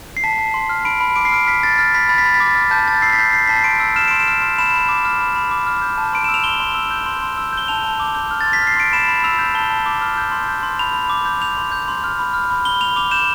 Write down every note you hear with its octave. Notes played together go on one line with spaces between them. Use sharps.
C7
A5 B6
A5
C6
F6
B5 D7
B5
D6 D7
C7
F6 D7
F6 B6
B5 A6
F6 A6
B5 B6
B5 A6
B6
B5 A6
B6
D6 A6
F6
A5 G6
A5 A6
E6 C7
B6
G6 C7
G6 C7
A5 B6
C7
C6 D7
E6
F6 E7
C6 D7
E7
F6
C6
B5 E7
B5
D6
F6
B5
B5
D6
F6
G6
A5
C6 D7
E6 E7
F7
C6 G7
C6
E6
G6
C6
C6
E6
G6 G7
A5 F7
A5
D6
G6
F6
A6
C6
B6
F6
C7
C6 D7
B5 E7
B5
E6 F7
G6
A5 G7
A5
D6
F6
G6
C6
G6
C6
B5 F7
B5
D6
G6
G6 F7
C6
G6
C6
F6
B5
F6
B5
B5 G7
B5 F7
D6 F7
G6 E7